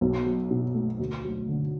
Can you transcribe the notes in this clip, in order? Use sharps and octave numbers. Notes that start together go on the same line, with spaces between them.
B1
F#3
B2
A3
D2
F#3
D3